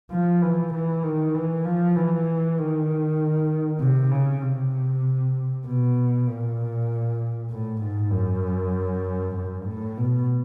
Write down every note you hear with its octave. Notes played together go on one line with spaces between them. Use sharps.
F3
E3
E3
D#3
E3
F3
E3
D#3
C3
C#3
C3
B2
A#2
A2
G#2
F#2
F#2
A2
B2